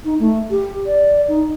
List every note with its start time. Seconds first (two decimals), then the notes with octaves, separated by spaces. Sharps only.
0.05 D#4
0.20 A3
0.51 G4
0.86 D5
1.29 D#4